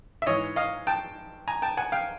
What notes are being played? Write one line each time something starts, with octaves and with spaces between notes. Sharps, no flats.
E5
G#2 E3 C#5 D#5
D#5 F5
G5 A5
G#5 A#5
G5 A5
F#5 G#5
F5 G5